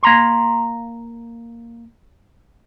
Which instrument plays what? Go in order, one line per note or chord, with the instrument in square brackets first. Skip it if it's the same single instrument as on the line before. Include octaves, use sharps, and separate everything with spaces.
[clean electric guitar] A#3 A#5 C6